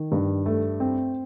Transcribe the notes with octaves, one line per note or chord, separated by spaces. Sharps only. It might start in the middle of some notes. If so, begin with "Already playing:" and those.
Already playing: D#3
G2
A3
C4